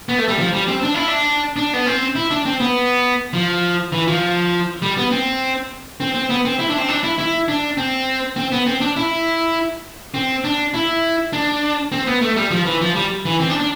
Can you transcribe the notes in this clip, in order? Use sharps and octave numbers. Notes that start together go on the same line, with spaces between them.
B3
A3
G3
F3
G3
C4
D4
E4
D4
D4
B3
C4
E4
D4
C4
B3
F3
E3
F3
G3
B3
C4
C4
C4
B3
C4
E4
D4
C4
D4
E4
E4
D4
C4
C4
B3
C4
D4
E4
C4
D4
E4
D4
C4
B3
A3
G3
F3
E3
F3
G3
E3
C4
D4
D4